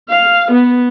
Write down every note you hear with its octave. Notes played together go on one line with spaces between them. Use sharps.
F5
B3